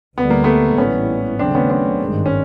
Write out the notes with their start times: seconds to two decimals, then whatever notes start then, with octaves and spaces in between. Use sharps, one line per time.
0.18 D2 D3 G3 B3
0.30 A#3
0.44 A3 B3
0.78 A1 G#2 E3 G3 B3 C#4
1.39 D#2 C#3 F#3 A3 C4 D4
1.55 B3 C#4
1.70 C4 D4
2.00 G#1 G2 D#3 G#3
2.26 C#4